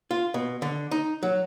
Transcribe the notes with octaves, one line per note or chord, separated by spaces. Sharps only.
F4
B2
D3
D#4
F#3